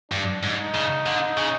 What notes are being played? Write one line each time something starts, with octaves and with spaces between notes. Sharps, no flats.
G2 D4
G#2
D#4
C#3
D3
C#3